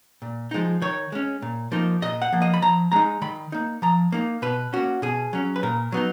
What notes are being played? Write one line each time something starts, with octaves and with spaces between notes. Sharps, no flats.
A#2
F3 G#3 D#4
D#3 C#5
G#3 C#4
A#2
F3 A#3 D#4
A#2 D#5
F#5
F3 A#3
D#5
B5
F3 A#5
G#3 D#4 A#5
D#3 B5
A#3 D#4
F3 A#5
A#3 D#4
B2 B4
A#3 C#4 F#4
B2 G#4
F#3 C#4
B4
A#2 A#4
F#3 B3 D#4